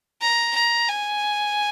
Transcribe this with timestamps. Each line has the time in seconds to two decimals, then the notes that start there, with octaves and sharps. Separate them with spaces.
0.21 A#5
0.55 A#5
0.89 G#5